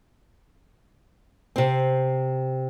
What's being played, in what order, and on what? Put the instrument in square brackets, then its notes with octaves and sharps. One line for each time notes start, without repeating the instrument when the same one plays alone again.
[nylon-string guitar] C3 C4